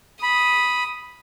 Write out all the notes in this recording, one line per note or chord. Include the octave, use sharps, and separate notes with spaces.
B5 D#6